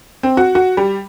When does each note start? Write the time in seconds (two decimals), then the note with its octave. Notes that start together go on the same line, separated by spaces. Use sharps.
0.23 C4
0.37 F#4
0.55 F#4
0.77 G3